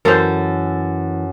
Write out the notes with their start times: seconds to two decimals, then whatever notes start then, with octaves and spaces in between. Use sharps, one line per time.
0.05 F#2 E3 A4 A#4 C5